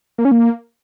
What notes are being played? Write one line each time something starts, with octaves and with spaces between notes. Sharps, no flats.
A#3
C#4
A#3